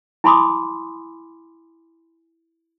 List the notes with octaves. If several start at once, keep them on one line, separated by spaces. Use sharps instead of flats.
E4 G#5 B5 C6 D6 D#6